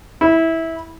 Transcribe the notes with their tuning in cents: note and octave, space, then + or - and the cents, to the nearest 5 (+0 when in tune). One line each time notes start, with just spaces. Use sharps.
E4 -15